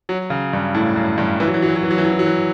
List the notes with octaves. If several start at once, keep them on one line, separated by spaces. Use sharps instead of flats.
F#3
C#3
G2
A2
F#2
G2
E3
F#3
E3
F#3
E3
F#3
E3
F#3
E3
F#3
E3
F#3
E3